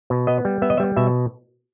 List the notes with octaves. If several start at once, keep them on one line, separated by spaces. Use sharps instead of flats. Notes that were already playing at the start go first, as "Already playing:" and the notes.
B2
B3 D#5
G3
B3 E5
D#5
G3 E5
B2 E5